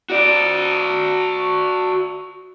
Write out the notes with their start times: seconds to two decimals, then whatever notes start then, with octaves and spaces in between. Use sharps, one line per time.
0.10 F#4 D5